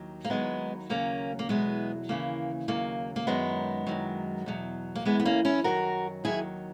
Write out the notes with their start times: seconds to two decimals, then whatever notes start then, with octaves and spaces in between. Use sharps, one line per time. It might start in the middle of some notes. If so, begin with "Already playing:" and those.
Already playing: D#2 D#3 F#3
0.25 A#3
0.30 D#2 D#3 F#3 G#3 B3
0.89 D#2 C#3 F#3 A#3 C#4
1.39 A#3
1.49 E2 B2 F#3 G#3 B3
2.09 D#2 C#3 E3 A#3
2.68 D#2 C#3 F#3 A#3
3.16 A#3
3.27 F#2 D#3 F#3 G#3 B3
3.87 F#2 D#3 F#3
4.46 E2 B2 F#3
4.95 A#3
5.05 F#2 E3 G#3 B3
5.20 B3
5.25 A#3 C#4
5.45 C#4 E4
5.64 F#2 D#3 F#3 F#4 A#4
6.24 D#2 D#3 F#3 E4 G#4